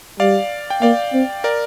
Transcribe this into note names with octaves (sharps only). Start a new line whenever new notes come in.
G3 D5 F5
G5
A#3 D5 F5
C4
A#4 D5